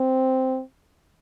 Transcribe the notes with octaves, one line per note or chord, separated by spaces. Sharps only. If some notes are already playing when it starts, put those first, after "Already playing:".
Already playing: C4